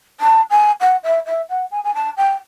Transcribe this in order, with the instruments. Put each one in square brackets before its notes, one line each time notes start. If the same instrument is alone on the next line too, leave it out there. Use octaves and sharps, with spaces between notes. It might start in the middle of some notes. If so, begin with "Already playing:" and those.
[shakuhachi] A5
G#5
F#5
E5
E5
F#5
G#5
G#5
A5
G5